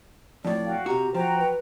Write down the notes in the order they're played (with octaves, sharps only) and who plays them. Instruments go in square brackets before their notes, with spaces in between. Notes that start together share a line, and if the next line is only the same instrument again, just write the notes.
[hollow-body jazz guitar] F2 A2 [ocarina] D5
[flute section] F#4 F5 G5
[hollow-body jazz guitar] C3 F#4 [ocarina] G4 [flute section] A#5
[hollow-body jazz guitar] F3 [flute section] F#4 G5 A#5 [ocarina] C5
[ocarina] B4